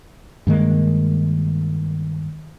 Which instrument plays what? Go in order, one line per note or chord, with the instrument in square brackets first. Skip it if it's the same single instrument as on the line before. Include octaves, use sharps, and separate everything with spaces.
[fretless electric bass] G2 D#3 G#3 A#3